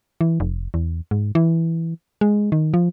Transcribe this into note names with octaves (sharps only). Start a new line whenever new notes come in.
E3
F1
E2
G#2
E3
G#3
D#3
F3